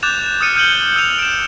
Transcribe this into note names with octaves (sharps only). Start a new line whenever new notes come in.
D6 F#6 G6 A6 E7 F7
D#6 F6 A6 C#7 D#7
F6 G6 C#7 D#7 F#7 G7
E6 D#7 F7 G7
D7 E7